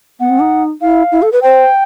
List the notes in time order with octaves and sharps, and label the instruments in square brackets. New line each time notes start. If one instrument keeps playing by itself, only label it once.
[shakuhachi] B3 [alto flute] F#5
[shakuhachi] C4
D#4
[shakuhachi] E4 [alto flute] F5
[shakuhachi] E4
A4
B4
[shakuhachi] C5 [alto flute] G5